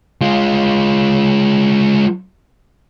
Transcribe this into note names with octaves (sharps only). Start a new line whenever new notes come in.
G#3 F4